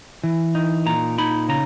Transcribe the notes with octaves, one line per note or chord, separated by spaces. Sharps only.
E3
D#4
A#2 A#5
D#4 B5
C#3 A#5